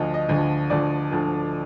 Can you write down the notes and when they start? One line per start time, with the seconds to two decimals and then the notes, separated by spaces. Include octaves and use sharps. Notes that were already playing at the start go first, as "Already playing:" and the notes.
Already playing: D2 D3 F3 D#5
0.14 D#5
0.29 D2 D3 F3
0.70 D2 D3 F3 D5
1.12 D2 D3 F3